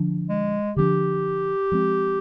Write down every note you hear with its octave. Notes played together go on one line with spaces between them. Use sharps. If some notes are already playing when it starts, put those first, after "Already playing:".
Already playing: D3 F3 D4
G#3
D3 F3 B3 D4 G4
F3 G#3 C4